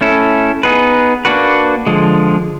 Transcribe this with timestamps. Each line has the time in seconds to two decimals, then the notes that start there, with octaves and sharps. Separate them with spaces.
0.01 A3 C#4 E4 A4
0.63 B3 D#4 G#4 B4
1.25 A#3 D4 F#4 B4
1.87 D3 F3 G#3